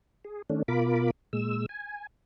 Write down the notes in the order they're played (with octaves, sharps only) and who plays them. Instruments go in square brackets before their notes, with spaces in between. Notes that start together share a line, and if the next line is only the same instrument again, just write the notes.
[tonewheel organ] G#4
D#3 A3 C#4 D4
B2 F4 A#4 B5 D6
A#2 G#3 E6
G#5